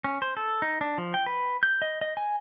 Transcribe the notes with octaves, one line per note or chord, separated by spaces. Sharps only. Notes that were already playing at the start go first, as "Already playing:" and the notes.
C#4
C5
A4
D#4
D4
F3
G5
B4
G6
D#5
D#5
G#5